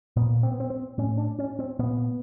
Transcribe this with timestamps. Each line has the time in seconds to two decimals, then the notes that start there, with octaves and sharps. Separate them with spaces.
0.16 A#2 B3
0.43 C4
0.52 B3
0.60 C4
0.70 C4
0.98 A2 C#4
1.17 D4
1.39 C#4
1.59 C4
1.79 A#2 B3